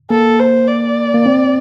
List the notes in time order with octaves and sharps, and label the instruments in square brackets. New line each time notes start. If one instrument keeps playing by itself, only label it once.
[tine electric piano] A#3 [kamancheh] A4
[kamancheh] C5
D5
[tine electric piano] A#3
C4